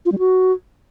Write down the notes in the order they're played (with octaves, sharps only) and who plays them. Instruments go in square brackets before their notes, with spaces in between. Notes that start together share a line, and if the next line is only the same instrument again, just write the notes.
[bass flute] F4
G3
F#4